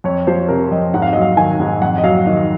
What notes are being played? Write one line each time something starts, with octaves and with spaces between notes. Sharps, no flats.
F2 C#5
F3 C5
C3 A#4
F2 D#5
G#2 F#5
F5
F#3 D#5
F5
D#3 G#5
G#2
F2 F#5
D#5
F#3 F5
D#3 D#5